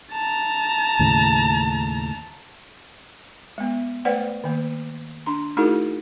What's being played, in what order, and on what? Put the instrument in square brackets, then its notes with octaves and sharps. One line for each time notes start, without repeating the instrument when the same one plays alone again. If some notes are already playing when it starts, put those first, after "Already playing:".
[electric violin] A5 A#5
[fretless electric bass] D#2 A2 C#3
[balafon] G#3 B3
A3 B4 C5 D5 F#5 G5
D#3 A#3
D4 A#5 C6
A3 D#4 E4 F#4 G#4 A#4